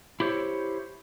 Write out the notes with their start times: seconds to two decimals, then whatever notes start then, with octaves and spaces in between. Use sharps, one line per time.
0.20 E4 G4 C5 C#5